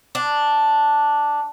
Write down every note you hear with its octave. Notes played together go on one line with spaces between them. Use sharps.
D4